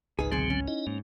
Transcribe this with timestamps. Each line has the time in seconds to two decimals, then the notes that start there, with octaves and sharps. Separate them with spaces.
0.19 G#1 C#2 D#4 G#4 B4
0.32 B1 D3 F#3 C4 G#4 C5
0.50 C#4
0.68 D#4 E4 D#5
0.87 G#2 A#3